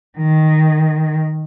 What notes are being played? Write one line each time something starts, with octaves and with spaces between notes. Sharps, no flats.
D#3